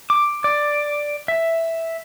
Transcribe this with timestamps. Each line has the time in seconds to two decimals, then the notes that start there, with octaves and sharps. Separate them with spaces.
0.10 D6
0.44 D5
1.28 E5